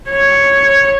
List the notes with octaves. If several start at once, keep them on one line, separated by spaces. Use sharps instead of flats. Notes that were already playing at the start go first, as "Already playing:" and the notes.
C#5